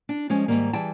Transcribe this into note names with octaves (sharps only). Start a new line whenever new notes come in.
D4
F3 G3 G#3 C#4
G#2 C3 D#3 G3 A#3
E3 G3 G#4 G5 A5